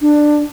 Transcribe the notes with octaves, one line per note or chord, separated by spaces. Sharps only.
D4